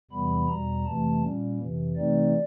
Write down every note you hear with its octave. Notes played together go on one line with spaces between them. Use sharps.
E2 C3 E3 G3 B3 B5
E2 B2 G3 A#5
F2 C3 E3 A3 A5
A#2 G3 A#3 C#4
F2 C3 E3
C3 E3 A3 C4 D#4 D5